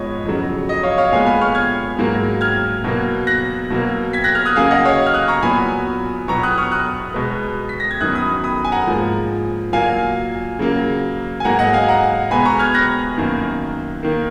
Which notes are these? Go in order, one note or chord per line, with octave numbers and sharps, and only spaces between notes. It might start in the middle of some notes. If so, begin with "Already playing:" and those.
Already playing: G#2 F3 G#3 B3 C#5 D#5
F2 C#3 F#3
D#5
C#5 F5
C#5 F5
A#2 G#3 B3 F5 G#5
G#5 B5
C#6 F6
F6 G#6
G#2 F#3 A#3
F6 G#6
B2 F#3 A#3
F#6 A#6
B2 F#3 A#3
G#6 B6
F#6 A#6
F6 G#6
D#6 F#6
C#3 F#3 A#3 F5 G#5
D#5 F#5
C#5 F5
F6
D#6 F#6
A#5 C#6
A#2 F#3 B3 G#5 B5
B2 F#3 B3 A#5 C#6
D#6 F#6
C#6 F6
D#6 F#6
B2 G#3 B3
B6
A#6
G#6
F#2 D#3 F#3 B3 D#6 F#6
B5 D#6
B5 D#6
G#5
F#5 A#5
G#2 F3 A#3
A#2 F#3 A#3 F5 G#5
C#3 F#3 A#3
G#5
G#2 F#3 A#3 F#5 A#5
D#5 F#5
F5 G#5
F#5 A#5
B2 G#3 B3 G#5 B5
A#5 C#6
F6 G#6
F#6 A#6
F#2 D#3 A#3
D#3 A#3